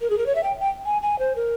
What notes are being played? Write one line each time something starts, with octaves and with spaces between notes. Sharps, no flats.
A#4
G#4
A#4
C#5
E5
G5
G5
G#5
G#5
C5
A#4